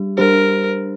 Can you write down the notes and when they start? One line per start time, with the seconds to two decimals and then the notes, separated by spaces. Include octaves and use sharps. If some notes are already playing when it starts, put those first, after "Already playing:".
Already playing: G3 D4 G4
0.17 G3 D4 G4 A#4 C5